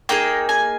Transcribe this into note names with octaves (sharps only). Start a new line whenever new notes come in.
A#3 D#4 G#4 G5
G#5